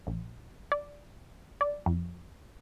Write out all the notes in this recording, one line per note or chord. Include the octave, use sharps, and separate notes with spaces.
A#1
D5
D5
F2